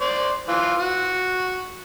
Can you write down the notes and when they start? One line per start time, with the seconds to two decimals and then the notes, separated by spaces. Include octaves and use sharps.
0.01 C5 D5
0.49 E3 F4
0.80 F#4